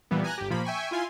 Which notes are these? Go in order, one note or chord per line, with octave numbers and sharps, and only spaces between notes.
A#2 E3 G3 B3
G#5 A#5 F#6 A#6
G1 G4
A#2 F3 A#3 B5
E5 G5 G#5 C#6
E4 F4 G#5 C6